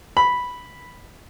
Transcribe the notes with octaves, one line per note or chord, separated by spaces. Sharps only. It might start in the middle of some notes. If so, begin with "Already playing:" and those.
B5